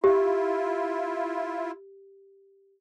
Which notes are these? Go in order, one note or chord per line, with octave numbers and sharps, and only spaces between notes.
E4 F4 G4